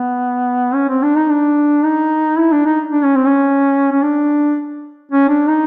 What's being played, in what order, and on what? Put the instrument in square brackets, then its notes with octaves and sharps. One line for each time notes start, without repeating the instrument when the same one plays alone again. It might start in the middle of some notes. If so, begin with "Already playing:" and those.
Already playing: [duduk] B3
C#4
C4
D4
D#4
D4
D#4
E4
D4
D#4
D4
C#4
C4
C#4
C#4
D4
C#4
D4
D#4